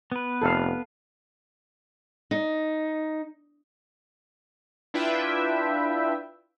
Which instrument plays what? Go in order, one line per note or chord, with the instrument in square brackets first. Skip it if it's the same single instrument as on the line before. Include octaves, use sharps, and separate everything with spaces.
[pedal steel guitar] B3 B4
[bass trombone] F1 [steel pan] A4 F5
[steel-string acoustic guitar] D#4
[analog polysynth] D4 E4 F4 B4 E5 G5